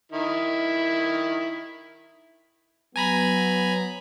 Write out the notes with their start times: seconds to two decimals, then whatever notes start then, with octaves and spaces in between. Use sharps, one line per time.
0.12 D#3 E4
2.96 F#3 B3 G#5 A#5 B5